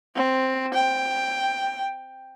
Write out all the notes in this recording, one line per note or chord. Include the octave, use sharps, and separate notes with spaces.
C4
G5